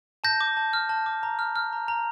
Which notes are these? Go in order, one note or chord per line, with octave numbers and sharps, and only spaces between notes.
A5 G6 A#6
D6
A5
F6
A5
D6
A#5
F6
F6
A#5
A#5